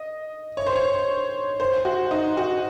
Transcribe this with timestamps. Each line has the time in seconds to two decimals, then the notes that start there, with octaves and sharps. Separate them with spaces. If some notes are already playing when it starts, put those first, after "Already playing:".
Already playing: D#5
0.57 C#5
0.67 C5
0.76 C#5
1.60 C5
1.85 F#4
2.11 D#4
2.37 F#4